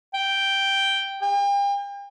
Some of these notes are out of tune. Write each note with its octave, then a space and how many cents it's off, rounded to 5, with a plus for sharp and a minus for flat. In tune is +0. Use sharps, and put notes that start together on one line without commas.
G5 +0
G5 +40